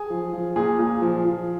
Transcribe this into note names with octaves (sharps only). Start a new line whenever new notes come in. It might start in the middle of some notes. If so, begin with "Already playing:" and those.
Already playing: G#4
F3
F3
A#2 G#4
A#2
F3
F3